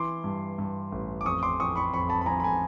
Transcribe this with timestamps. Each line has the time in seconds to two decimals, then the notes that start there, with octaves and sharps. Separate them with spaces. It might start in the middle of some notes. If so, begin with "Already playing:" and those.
Already playing: E3 C6 D6
0.24 G2
0.58 G2
0.92 A1
1.21 D6
1.25 F2 C#6 D#6
1.43 C6 D6
1.59 F2 C#6 D#6
1.76 B5 C#6
1.93 F2 B5 C#6
2.09 A5 B5
2.21 B5
2.26 F2 G#5 A#5
2.40 B5
2.44 G#5 A#5